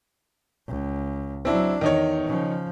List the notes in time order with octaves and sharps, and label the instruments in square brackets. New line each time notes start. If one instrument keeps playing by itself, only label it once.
[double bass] C#2
[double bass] F#3 D4 [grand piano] C4 E4
[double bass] E2 [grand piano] D#3 D#4 C#5
[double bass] C#3 F3